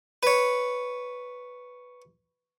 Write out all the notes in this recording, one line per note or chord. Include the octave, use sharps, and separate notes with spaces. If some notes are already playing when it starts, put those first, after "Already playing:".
B4 C#5